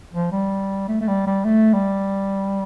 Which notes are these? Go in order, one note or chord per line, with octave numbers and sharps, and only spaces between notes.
F3
G3
A3
A3
G3
G3
A3
G3